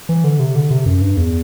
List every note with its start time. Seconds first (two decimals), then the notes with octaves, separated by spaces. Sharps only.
0.09 E3
0.24 D3
0.40 C3
0.55 D3
0.70 C3
0.86 F#2
1.02 G2
1.17 E2